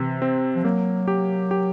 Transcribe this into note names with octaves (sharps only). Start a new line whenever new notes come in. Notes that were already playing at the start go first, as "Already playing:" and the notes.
Already playing: C3 E3
C4
F3
F#3 A#3
G4
G4